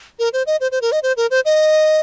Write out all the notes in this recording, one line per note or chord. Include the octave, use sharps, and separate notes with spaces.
A#4
C5
D#5
C5
C5
A#4
D#5
C5
A#4
C5
D#5